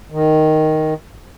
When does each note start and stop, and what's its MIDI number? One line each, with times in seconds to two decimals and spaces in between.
0.11 0.94 51